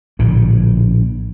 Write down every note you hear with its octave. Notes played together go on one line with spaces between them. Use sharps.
A#1 A2 D3